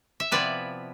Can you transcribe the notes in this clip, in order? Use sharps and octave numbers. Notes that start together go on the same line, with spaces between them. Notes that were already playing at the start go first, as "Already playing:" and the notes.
E5
C3 F3 B3 E4 B4 D5